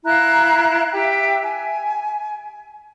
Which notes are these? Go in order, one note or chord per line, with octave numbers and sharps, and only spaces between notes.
E4 F5 A#5 F#6
G4 E5 G5
G#5